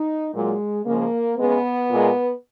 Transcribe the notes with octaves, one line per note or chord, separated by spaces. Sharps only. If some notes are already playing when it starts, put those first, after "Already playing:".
Already playing: D#4
A#2 F#3 G#3
C#3 F3 G#3 A#3
C#3 G#3 B3
A#2 G#3